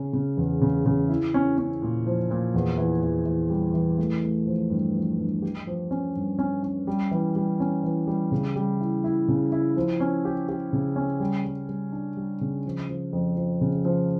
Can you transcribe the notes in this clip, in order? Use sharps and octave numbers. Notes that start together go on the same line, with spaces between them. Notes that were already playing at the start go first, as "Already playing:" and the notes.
Already playing: C#3 C#4
C#3
E2
C#3
C#3
E4
C#4
C#4
A#2
F3
A#2
E2
E3
E2
E3
G3
E3
A3
A3
F3
G2
F3
G2
G4
F3
C#4
G2
C#4
C#4
G3
E3
G3
C#4
E3
G3
C#3
G3
E4
E4
C#3
E4
F3
C#4
G4
G4
C#3
C#4
G3
G3
G3
D4
G3
C#3
F3
F3
F2
F3
C#3
F3